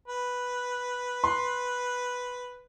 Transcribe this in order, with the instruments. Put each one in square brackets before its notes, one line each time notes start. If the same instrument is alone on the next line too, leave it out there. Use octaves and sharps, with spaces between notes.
[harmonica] B4
[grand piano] C6